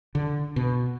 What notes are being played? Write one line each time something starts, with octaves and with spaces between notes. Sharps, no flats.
D3
B2